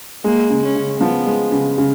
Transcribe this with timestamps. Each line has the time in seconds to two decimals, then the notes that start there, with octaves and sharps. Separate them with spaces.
0.24 G#3 A#3
0.50 C#3
0.63 C#4
0.75 C#3
1.00 F3 B3
1.26 G#3
1.52 C#3
1.78 C#3